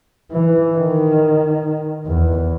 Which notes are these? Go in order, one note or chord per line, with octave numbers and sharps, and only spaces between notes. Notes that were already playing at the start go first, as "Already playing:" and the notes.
E3
D#3
E2